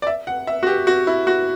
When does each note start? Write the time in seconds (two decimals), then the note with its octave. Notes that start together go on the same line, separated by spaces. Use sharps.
0.02 D5
0.07 E5
0.27 F#5
0.47 E5
0.63 F#4
0.67 G4
0.87 F#4
1.07 E4
1.27 F#4